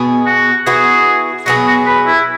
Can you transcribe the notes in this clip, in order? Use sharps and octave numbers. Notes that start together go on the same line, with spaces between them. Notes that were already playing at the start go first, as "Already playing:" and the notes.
Already playing: B2 B3 G#4
F#4
E3 B3 F#4 G#4
B2 F#3 B3 F#4 G#4
F#4
B4
E4